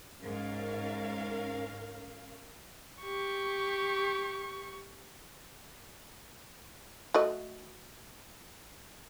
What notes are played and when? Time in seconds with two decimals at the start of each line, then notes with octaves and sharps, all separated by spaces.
0.22 G#2 C#4 A#4 F5
3.02 G4 C#6
7.14 A3 F#4 D#5